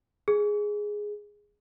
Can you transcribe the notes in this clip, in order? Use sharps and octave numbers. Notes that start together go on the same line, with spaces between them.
G#4